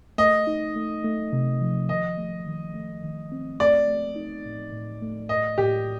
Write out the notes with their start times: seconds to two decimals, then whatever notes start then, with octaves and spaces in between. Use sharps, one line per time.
0.18 A3 D#5
0.47 D#4
0.76 A3
1.04 A3
1.33 C3
1.61 F3
1.89 D#3 D#5
2.18 A3
2.46 D#3
2.74 A3
3.03 D#3
3.32 C4
3.60 A3 D5
3.88 A3
4.16 D#4
4.45 A2
4.73 A2
5.02 A3
5.29 A2 D#5
5.58 A2 G4